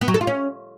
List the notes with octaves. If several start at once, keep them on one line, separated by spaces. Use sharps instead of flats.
B3
F#3
A4
F4
C#4